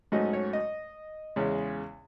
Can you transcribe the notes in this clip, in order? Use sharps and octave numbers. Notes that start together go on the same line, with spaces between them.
G#2 F#3 A3 C#4 D#5
C#5
D#5
E2 C#3 G#3